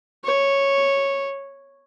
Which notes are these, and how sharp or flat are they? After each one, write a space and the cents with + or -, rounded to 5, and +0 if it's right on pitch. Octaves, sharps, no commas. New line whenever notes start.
C#5 -5